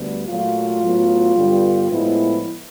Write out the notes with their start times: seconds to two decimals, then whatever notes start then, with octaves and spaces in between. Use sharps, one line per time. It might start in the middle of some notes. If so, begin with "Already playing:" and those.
Already playing: D2 D3 G3 B3
0.27 A#2 F#3 A3 F4
0.82 A2 F#3 B3
1.35 G2 D3 G3 B3
1.89 A2 F3 G#3 B3 E4